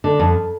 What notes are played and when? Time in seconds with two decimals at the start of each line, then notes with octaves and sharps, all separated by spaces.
0.04 D3
0.20 F2